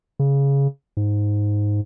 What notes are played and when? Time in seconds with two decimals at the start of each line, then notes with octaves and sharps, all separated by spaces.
0.19 C#3
0.97 G#2